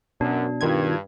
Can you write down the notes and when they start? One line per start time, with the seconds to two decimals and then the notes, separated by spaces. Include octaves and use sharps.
0.21 F#2 B2 D4
0.61 G2 D#3 F4 G#6